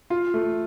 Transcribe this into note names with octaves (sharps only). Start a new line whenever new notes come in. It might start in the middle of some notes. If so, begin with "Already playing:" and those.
F4
A3